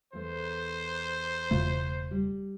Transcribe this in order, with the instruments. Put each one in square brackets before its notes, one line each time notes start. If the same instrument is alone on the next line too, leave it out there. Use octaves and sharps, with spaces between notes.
[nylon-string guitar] E2 A3 [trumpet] C5
[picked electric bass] E1 C#3 A3 [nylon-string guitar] F4
[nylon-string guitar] G3